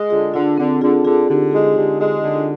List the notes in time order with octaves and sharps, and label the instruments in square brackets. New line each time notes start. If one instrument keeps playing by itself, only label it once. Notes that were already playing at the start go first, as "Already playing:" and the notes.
Already playing: [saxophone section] G#3
[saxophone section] D3 [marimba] F4 G#4
[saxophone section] D3 [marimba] D4 F4
[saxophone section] D3 [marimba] C4
[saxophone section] D3 [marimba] F4 G#4
[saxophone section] D3 [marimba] F4 G#4
[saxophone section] D3 [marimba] D#4 G4
[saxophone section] G#3 [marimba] F4 G#4
[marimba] G#4
[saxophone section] D3 [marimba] D#4 G4
[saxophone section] G#3 [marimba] F4 G#4
[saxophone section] D3
[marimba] D#4
D4 F4